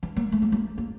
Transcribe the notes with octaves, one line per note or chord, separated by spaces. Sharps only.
E3
A#3
A3
A#3
A#3
A#3